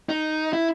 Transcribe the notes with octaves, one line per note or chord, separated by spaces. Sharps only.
D#4
E4